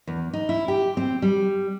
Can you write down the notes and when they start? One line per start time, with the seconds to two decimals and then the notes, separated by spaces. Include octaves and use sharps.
0.07 E2
0.33 D#4
0.49 E4
0.68 G4
0.97 C4
1.22 G3